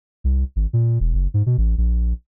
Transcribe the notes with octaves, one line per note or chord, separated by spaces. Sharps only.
C2
G#1
A#2
E1
F#1
G#2
B2
A1
A#1